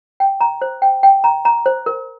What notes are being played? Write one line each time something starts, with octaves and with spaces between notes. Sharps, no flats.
G5
A#5
C5
G5
G5
A#5
A#5
C5
A#4